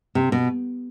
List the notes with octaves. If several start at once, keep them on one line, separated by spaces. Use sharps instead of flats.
C3
B2